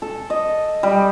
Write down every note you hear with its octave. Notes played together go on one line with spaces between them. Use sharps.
A4
D#5
G3